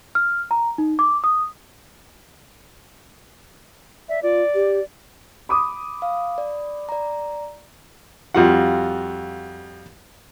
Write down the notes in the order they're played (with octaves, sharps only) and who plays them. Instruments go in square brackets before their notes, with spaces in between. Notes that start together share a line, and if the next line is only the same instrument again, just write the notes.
[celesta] F6
A#5
D#4
D6
D#6
[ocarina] D5 [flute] E5
[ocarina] F4 [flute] D5
[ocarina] G4
[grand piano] B5 D6 D#6
[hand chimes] F5
D5
D5 A#5
[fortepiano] F2 G3 F4 F#4 F#5